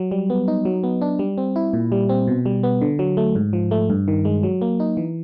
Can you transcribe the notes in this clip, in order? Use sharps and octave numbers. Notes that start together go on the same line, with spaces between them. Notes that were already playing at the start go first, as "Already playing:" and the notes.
Already playing: F#3
G3
B3
D#4
F#3
B3
D4
G3
C4
E4
A#2
G3
C4
B2
G3
B3
D3
F#3
A3
G#2
F3
A3
G2
D#3
G#3
F#3
A#3
D#4
E3